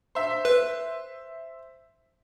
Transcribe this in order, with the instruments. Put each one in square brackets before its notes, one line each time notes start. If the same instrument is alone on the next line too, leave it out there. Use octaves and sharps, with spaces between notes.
[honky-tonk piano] C5 E5
[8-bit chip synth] B4